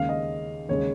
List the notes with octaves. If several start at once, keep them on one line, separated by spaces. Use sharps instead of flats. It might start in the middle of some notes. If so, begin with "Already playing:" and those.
Already playing: D#2 C#3 G#3 F5
D#5
D#2 C#3 G#3 C#5